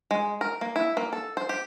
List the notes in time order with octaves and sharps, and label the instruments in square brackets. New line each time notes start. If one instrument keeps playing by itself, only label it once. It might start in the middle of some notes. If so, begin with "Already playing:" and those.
[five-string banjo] G#3
A#4
A#3
E4
A#3
A4
C5
G4